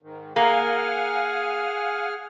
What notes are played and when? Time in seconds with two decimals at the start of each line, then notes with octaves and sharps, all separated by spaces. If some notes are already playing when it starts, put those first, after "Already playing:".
0.02 G#2 D#3
0.36 A#3 G#4 F5 F#5 G#5 F6